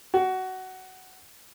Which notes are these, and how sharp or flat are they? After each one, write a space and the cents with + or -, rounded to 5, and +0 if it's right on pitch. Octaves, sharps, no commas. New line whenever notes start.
F#4 +15